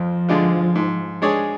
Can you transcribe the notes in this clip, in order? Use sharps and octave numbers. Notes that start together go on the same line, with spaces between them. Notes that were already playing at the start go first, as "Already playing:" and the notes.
Already playing: F2 F3
D3 G#3 D4 F4
G#2
G#3 D4 G#4 C#5